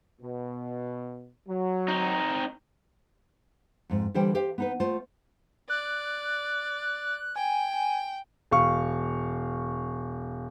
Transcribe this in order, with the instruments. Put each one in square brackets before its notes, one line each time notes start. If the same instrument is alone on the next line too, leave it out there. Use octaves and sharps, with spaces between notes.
[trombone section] B2
F#3
[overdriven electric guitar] C4 D#4
[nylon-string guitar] F2 G#2
D3 E3 G3 C5 G5
G4 C5 F5
B3 D#4 B4
A3 F4 C5
[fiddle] D5 [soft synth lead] F#6
[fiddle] G5 [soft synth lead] G#5
[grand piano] E1 F5 C#6